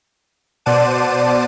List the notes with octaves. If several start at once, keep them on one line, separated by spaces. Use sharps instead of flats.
B2 C5 D5 F#5 A5 D#7